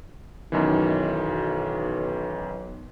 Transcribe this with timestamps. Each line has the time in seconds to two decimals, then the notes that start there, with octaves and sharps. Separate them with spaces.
0.52 B1 F#2 D#3 E3